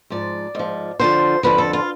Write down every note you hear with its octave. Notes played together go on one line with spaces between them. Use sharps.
G#2 F3 D5
G#2 F3
F2 D3 F3 C5
F2 D3 F3 B4
A4
F4